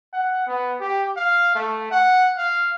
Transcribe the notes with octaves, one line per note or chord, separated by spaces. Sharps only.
F#5
B3
G4
F5
A3
F#5
F5